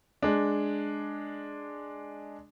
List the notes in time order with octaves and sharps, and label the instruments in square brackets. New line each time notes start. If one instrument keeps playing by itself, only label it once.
[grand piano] G#3 D4